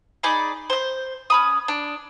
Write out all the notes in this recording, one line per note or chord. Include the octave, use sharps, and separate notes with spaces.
D#4 G#4 D5 B5
C5 G6
C#4 B5 D#6
D4